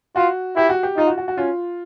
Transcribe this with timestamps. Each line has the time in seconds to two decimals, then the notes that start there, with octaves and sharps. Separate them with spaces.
0.16 F4 F#4
0.56 E4 G4
0.69 F#4
0.83 G4
0.97 D#4 F4
1.07 F#4
1.18 F#4
1.28 F#4
1.38 C#4 F4